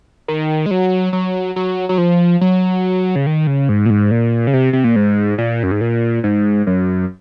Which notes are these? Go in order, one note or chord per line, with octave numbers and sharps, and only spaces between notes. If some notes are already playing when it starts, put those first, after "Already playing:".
D#3
G#3
F#3
F#3
F#3
F#3
F3
F#3
C#3
D#3
C#3
G#2
A#2
G#2
A#2
C#3
C3
C3
A#2
G#2
A#2
F#2
G#2
A#2
G#2
F#2